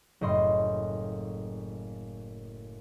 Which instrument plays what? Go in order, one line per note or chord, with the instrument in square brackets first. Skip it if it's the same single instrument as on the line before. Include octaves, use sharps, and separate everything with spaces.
[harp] F#1 A2 D#5 C6